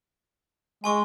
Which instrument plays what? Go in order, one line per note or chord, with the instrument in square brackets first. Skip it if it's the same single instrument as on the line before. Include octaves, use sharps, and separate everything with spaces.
[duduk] G#3 [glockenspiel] G#5 C6 C#6